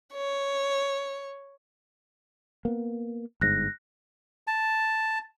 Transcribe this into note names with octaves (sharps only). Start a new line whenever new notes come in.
C#5
A#3 B3
G1 G#2 F#6 A#6
A5